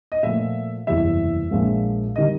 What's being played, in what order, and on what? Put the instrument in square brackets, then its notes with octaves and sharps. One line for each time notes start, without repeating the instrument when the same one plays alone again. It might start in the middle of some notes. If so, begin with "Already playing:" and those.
[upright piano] D#5
[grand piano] A#2 F3 A3 [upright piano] E5
[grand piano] F#1 E2 C3 E3 G3 [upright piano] E5
[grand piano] A#1 A#2 F3 G#3
[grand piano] D#3 G3 [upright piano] D#5